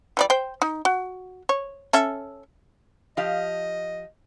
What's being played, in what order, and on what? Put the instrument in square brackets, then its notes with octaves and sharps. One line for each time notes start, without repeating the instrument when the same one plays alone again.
[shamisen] E3 G3 D5
C5 G5
D#4
F#4
C#5
C#4 A4 E5
[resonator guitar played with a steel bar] F3 G4 F5 [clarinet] D#5